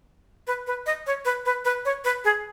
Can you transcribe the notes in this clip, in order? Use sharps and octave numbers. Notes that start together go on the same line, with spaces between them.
B4
B4
D#5
C#5
B4
B4
B4
C#5
B4
G#4